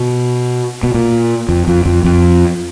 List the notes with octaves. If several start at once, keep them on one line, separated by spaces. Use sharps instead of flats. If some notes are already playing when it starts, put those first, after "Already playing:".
Already playing: B2
B2
A#2
F2
F2
F2
F2